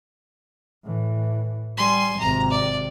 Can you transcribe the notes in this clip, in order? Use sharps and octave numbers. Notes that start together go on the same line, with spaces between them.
A2 E3
G3 G#5 C6
G#1 C3 A#5
D5